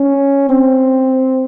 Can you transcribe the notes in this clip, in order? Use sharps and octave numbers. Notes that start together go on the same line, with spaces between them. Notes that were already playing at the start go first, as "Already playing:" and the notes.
Already playing: C#4
C4